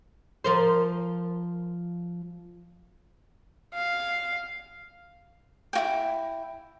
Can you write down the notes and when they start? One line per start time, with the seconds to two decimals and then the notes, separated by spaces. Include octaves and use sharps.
0.44 F3 A#4 C5
3.74 F5
5.73 E4 F#4 G5